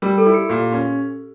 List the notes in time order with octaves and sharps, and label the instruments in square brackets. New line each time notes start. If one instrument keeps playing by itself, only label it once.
[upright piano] G3 [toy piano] A#4
[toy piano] A4
[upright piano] E4
[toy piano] G4
[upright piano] A#2
C#4